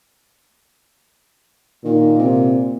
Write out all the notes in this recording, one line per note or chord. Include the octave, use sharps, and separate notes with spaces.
A#2 D#3
C3